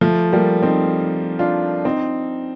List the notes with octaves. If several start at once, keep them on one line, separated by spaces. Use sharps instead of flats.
F3 A3
G3 A#3
C4 D#4
D4 F4
C4 D#4